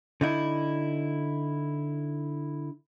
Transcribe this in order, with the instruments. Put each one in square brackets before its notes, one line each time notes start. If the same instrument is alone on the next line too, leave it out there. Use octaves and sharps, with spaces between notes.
[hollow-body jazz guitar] D3 D#4 E4